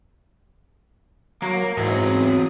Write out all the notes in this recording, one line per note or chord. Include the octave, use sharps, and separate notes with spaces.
F#3 A#3
E2 G#2 E3 F#3 C4 G#4 D#6